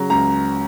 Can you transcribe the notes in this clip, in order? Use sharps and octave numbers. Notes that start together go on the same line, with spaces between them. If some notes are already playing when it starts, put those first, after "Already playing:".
Already playing: C#3 F#3 A#5
C#2 A#5